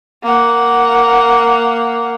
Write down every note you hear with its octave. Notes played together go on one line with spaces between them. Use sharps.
A#3 F#5